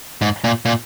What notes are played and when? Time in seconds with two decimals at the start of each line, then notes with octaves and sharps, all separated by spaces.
0.22 G#2
0.44 A#2
0.65 A#2